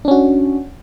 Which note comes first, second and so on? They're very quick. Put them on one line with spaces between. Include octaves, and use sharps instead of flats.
D4 C#4 F#4